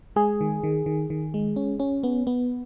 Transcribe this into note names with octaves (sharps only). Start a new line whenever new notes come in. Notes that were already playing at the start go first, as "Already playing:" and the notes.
G#3 G#4
D#3
D#3
D#3
D#3
G#3
C#4
C#4
B3
B3